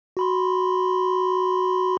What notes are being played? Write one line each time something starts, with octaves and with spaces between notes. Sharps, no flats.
F#4 B5 C6